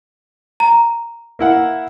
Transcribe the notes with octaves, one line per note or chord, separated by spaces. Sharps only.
A#5
A#3 E4 F#5